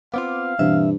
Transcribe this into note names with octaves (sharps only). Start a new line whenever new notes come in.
B3 C4 F4 F5 D6
G2 B2 E3 C4 E5